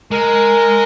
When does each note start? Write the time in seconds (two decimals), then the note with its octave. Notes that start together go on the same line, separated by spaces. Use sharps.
0.11 G#3 A#4